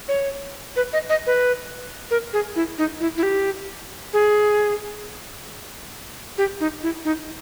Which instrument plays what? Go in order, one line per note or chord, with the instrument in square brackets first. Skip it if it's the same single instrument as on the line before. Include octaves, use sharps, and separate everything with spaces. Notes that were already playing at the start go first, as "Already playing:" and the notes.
[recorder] C#5
B4
D#5
D#5
B4
A#4
G#4
E4
D#4
E4
E4
G4
G#4
G4
D#4
E4
D#4